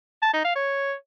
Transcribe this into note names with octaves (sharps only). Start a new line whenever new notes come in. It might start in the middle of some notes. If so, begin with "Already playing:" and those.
A5
D#4
F5
C#5